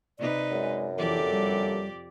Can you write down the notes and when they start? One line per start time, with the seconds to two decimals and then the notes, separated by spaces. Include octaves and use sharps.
0.19 C3 D#4 B4 D5
0.51 F#2 G#3
0.98 F2 D3 E3 A#3 G4 A4 D5
1.30 G3